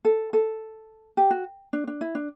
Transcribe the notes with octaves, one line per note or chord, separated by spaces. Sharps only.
A4
A4
G4
F#4
D4
D4
E4
D4